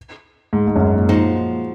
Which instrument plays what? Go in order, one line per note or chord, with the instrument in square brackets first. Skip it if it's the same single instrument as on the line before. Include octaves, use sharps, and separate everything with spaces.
[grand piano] G#2
G#2
F#2
G#2
A#2
[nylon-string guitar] F3 G#3 D#4 F#4